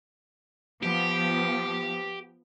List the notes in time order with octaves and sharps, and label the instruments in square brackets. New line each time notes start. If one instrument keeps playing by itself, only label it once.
[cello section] F3 B3 [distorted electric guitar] G4